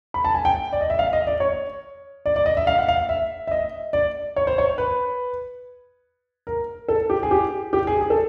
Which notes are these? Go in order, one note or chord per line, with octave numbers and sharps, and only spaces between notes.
B5
A5
G#5
G5
D5
D#5
E5
F5
D#5
D5
C#5
D5
D5
D#5
E5
F5
F#5
F5
E5
E5
D#5
D5
C#5
C5
C#5
B4
A#4
A4
G4
G#4
G4
G4
G#4
G#4
A4